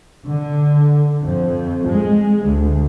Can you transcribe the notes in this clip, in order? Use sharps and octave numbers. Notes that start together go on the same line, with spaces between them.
D3
F2
G#3
D2